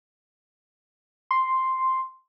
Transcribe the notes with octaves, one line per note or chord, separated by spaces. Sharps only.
C6